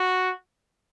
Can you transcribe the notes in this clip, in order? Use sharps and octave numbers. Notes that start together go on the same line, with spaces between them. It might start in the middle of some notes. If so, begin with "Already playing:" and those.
Already playing: F#4